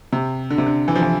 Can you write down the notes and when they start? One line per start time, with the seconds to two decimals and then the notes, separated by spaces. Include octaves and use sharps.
0.13 C3
0.50 D3
0.58 C3
0.66 D3
0.88 E3
0.95 F3
1.02 E3